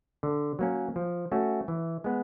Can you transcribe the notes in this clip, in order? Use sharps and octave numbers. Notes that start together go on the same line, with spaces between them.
D3
F#3 A#3 C#4
F3
A3 C#4 F#4
E3
G#3 B3